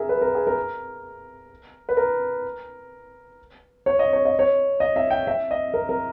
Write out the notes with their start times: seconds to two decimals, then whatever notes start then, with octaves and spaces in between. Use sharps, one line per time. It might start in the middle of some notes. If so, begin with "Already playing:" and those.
Already playing: G#4 A#4 E5
0.09 B4
0.22 A#4
0.35 G#4
0.47 A#4
1.89 B4
1.97 A#4
3.86 C#5
3.99 D#5
4.13 C#5
4.25 D#5
4.39 C#5
4.80 D#5
4.96 E5
5.11 G5
5.27 E5
5.51 D#5
5.74 A#4
5.89 A#4